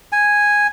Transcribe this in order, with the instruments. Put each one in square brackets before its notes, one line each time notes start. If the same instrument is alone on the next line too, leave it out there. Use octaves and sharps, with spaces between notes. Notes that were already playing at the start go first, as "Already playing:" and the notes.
[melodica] G#5